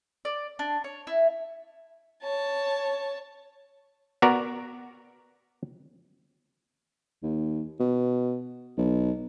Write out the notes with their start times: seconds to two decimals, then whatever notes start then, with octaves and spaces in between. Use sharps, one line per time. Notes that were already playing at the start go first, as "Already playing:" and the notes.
0.25 D5
0.59 D4
0.84 C#5
1.07 E4
2.23 C#5 A5
4.22 B3 F#4 A#4 D5 A#5
7.23 D#2
7.80 B2
8.78 B1